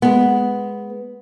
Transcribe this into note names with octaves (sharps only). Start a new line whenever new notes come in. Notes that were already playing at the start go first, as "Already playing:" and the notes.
G#3 B3